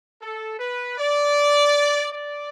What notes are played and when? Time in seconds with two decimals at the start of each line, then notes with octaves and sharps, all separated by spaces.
0.21 A4
0.59 B4
0.98 D5
2.12 D5